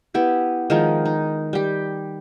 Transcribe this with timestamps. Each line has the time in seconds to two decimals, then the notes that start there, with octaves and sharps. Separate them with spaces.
0.14 B3 E4 G4
0.70 D#3 F3 G#3 D#4
1.05 D#4
1.53 G3 G4